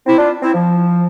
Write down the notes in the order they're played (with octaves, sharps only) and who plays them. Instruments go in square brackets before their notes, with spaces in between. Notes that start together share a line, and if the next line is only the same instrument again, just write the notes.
[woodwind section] C4 E4
D4 F4
C4 E4
F3